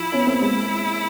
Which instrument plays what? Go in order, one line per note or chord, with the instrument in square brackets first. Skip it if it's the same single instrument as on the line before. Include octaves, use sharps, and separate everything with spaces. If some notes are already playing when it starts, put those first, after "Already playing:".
Already playing: [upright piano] F3 [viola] E4
[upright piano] B3 C#4
A#3 C4
B3
[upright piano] G#3 A#3 [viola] E4